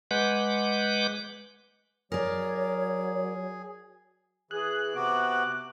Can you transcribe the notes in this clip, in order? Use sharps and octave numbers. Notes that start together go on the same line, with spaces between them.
G#3 B4 F#5 D6 G6
F#3 G#4 A#4 C#5 D5
E3 G#4 F#6
C3 B3 F#4 D6